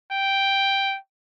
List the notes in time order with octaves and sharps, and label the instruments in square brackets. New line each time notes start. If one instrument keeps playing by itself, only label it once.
[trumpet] G5